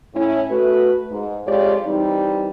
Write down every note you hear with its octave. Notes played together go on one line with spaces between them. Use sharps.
A2 C#4 E4
A3 F#4 B4
G#2
F2 G#3 F4 G4 C#5 D5
E3 G3 C4 D#4